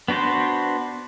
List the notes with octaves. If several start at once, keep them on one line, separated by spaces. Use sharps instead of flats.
B3 D4 F#4 B4 C5